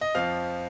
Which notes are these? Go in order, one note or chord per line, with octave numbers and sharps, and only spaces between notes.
D#5
F2 F3 F5